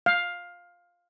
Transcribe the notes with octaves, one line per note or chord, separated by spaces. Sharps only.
F5